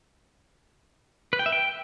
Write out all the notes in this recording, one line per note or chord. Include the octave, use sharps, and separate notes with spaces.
B4
G5
E5
G5